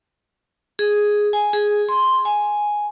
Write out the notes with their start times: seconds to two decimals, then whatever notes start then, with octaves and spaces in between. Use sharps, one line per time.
0.79 G#4
1.33 G#5
1.53 G#4
1.89 C6
2.25 G#5